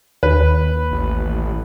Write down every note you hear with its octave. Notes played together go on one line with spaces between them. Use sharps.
D#2 B4
A1